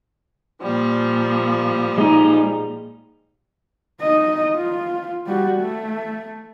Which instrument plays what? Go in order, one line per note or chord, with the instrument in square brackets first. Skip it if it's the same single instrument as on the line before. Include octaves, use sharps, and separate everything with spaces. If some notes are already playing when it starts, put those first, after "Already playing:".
[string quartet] A#2 F3 G3
[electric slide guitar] G#3 D#4
[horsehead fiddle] D#4 D#5
F4
G3 F#4
A3